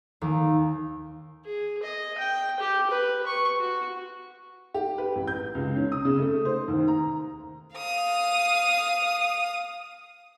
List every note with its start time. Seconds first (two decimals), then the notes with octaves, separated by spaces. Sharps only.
0.21 D#2
1.45 G#4
1.83 D#5
2.18 G5
2.60 G4
2.90 B4
3.27 C#6
3.59 F#4
4.74 G4
4.98 B4
5.15 A1
5.28 G6
5.55 C#2
5.76 C#4
5.92 D#6
6.05 C#3
6.19 A3
6.45 C5
6.68 D#2
6.88 A#5
7.76 F5 D#6